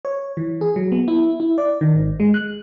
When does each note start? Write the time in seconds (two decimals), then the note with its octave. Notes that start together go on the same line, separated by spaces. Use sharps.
0.05 C#5
0.37 E3
0.61 G#4
0.76 F#3
0.92 B3
1.08 E4
1.40 E4
1.58 D5
1.81 D#3
1.95 G#1
2.20 G#3
2.34 F#6